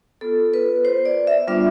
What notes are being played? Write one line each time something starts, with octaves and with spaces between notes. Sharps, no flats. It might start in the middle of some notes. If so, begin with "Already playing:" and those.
B3 F4 A4
B4
C5
D5
E5
G3 B3 D4 F4 E5